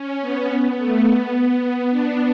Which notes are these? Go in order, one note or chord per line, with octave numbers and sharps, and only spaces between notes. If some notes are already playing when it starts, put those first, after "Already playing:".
Already playing: C#4
B3
B3
A3
B3
B3
D4